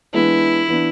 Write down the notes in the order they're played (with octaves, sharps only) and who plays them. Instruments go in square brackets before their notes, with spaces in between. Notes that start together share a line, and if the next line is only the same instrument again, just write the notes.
[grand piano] E3 G#3 B3 D4 G#4 [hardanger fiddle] E4
[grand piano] E3 B3 D4